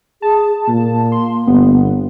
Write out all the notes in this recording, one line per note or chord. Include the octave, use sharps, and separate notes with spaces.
G#4 A5
A#2 A#3
C6
G1 B3